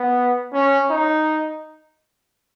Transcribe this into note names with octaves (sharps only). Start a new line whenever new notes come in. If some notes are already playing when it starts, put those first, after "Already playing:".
Already playing: B3
C#4
D#4